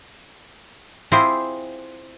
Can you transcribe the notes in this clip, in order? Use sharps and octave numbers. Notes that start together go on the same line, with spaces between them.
C4 E4 F4 G4 G#4 C5